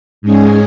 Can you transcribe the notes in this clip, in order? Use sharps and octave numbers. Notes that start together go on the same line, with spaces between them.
G#2 G#3 C#4 G#4